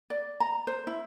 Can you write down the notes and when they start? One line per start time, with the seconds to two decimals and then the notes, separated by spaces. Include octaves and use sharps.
0.10 D5
0.40 A#5
0.67 C5
0.87 E4